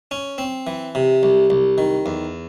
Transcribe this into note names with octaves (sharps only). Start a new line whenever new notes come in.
C#4
C4
E3
C3
C2
C2
D#3
E2